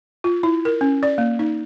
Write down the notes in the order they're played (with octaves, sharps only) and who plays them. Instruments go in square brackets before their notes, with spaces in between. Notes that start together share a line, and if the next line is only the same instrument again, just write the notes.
[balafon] F4
E4
A#4
C#4
D5
A#3
D#4